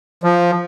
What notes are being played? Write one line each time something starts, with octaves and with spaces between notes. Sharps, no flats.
F3